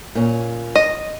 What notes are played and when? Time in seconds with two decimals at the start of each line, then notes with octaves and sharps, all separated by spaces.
0.15 A#2 C#4
0.75 D#5